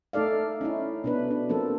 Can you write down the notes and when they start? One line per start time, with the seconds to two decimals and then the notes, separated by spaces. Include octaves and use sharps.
0.13 A3 D#4 A4 D5 F5
0.61 C#4 D#4 E4
1.04 B2 D4 B4
1.31 D4
1.49 F3 A#3 C4 A4